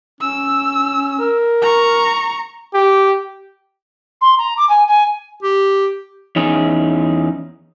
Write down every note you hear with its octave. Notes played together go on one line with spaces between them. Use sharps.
C#4 E6
A#4
A#5 C#6
G4
C6
A#5
D6
G#5
G#5
G4
E2 C#4 D#4 G#4